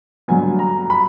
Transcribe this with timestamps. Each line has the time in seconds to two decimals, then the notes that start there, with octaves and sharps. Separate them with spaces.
0.28 G2 D3 F#3 B3 G#5
0.59 A#5
0.90 B5